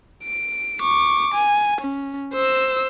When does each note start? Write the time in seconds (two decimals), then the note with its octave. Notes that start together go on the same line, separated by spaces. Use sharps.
0.24 D7
0.82 C#6 D6
1.34 G#5
1.81 C#4
2.34 C5 E6